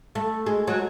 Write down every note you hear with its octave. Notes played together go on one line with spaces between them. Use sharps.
A3
G#3
F#3